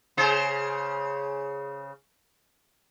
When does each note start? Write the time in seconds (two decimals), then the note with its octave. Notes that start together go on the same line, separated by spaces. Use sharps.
0.17 C#3 G#4 C5